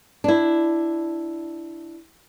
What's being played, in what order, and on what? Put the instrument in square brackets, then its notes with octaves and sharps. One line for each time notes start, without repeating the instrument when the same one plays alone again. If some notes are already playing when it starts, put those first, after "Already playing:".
[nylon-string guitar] D4 E4